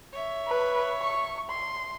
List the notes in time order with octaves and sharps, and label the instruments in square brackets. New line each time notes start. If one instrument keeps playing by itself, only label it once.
[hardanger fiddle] C#5 E5
[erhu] B4
C#6
C6